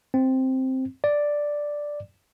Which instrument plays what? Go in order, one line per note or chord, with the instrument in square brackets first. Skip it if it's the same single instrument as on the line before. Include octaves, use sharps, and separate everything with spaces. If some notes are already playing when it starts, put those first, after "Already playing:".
[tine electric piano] C4
D5